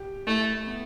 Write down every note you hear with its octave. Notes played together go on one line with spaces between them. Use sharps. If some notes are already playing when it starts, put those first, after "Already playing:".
Already playing: G4
A3 E4
B3